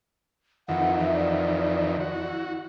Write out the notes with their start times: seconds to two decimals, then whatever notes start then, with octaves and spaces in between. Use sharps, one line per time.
0.69 F2 D#3 E3 F#5
0.99 E5
1.14 D5
2.00 F#4
2.13 E4